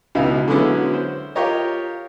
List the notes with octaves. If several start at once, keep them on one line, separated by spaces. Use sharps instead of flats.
C#2 B2 D#4 E4 F5
D3 F#3 G#3 B3 C#4 E4
C5
F4 G4 A#4 C#5 D#5